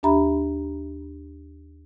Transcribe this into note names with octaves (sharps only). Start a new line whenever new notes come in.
D#2 D4 G4 E5 A#5 B5